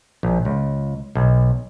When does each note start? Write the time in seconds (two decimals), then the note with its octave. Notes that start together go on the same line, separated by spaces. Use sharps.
0.23 A#1
0.45 C#2
1.15 B1